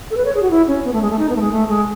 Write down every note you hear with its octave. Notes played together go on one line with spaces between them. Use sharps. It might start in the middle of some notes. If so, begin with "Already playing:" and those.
A4
B4
C#5
G#4
F#4
E4
C#4
B3
A3
G#3
A3
D#4
B3
A3
G#3
A3
G#3